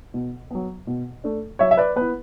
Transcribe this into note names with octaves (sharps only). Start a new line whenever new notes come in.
B2
F#3 B3
B2
A3 D4
F#3 C#5 E5
E5
B4 D5
B3 E4 B4